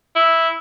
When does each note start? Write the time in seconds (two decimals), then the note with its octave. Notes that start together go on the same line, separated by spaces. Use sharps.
0.15 E4